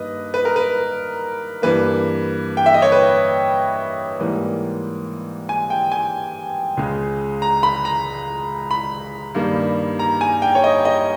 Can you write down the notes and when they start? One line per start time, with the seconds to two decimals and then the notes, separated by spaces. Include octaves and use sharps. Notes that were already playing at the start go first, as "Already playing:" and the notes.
Already playing: G2 D#3 A#3 B4 D#5
0.34 B4
0.45 A#4
0.56 B4
1.62 G2 E3 A#3 B4
2.57 G5
2.66 E5
2.74 D#5
2.82 C#5
2.92 B4
4.20 G#2 E3 G3 A#3
5.49 G#5
5.70 G5
5.92 G#5
6.77 C#2 C#3 G#3
7.42 A#5
7.63 B5
7.85 A#5
8.71 B5
9.35 G2 D#3 G3 A#3
9.99 A#5
10.21 G#5
10.42 G5
10.55 C#5
10.64 D#5
10.85 D#5